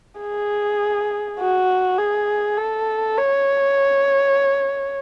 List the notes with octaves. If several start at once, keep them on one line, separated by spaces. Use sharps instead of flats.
G#4
F#4
G#4
A4
C#5